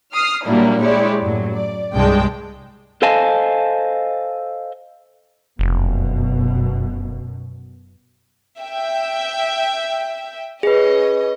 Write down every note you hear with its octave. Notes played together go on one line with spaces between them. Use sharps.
D#6 F6 C7
A#2 F#3 G3 A#3 D4 E4
G#3 E4 G4 C#5 D5
F#2 A2 F#3
D5
C2 G2 G#3 D5 G5 A5
A4 C5 D#5 F5 G#5 A5
F1 F#2 B2
E5 G5
C#4 G#4 B4 D#5